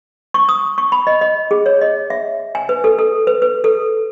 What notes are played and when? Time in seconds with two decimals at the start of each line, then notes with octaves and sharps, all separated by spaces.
0.34 C#6
0.49 D#6
0.78 C#6
0.92 B5
1.07 D#5
1.21 D#5
1.51 G#4
1.66 C#5
1.81 D#5
2.10 E5
2.55 G#5
2.69 B4
2.84 A4
2.99 A4
3.27 B4
3.42 B4
3.64 A4